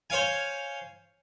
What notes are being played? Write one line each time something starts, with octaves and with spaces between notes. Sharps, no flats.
C5 C#5 F5 G#5